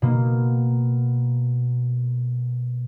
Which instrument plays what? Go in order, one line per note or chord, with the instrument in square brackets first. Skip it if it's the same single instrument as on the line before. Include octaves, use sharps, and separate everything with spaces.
[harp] B2 A#3